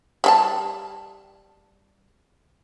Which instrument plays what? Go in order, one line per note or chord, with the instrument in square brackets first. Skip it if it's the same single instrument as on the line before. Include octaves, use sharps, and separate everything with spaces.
[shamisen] G3 A4 A5